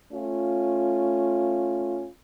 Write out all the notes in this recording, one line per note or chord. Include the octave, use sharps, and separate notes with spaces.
A3 C#4 F4